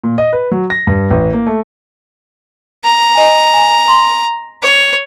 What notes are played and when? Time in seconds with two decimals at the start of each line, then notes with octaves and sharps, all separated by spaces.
0.04 A#2
0.18 D#5
0.33 B4
0.52 F#3
0.70 A#6
0.87 G2
1.11 A1
1.33 A#3
1.47 A3
2.84 A#5
3.15 D#5 G#5
3.54 G#5
3.88 C6
4.63 C#5